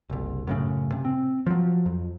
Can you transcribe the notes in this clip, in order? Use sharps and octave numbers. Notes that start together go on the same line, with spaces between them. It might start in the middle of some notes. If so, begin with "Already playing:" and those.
F#1 C2
F#2 A2 C#3
C3
C4
F3 F#3
F2